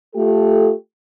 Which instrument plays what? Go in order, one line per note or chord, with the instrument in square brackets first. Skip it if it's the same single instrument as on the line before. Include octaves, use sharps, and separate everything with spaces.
[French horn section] A3 F4 G4 A4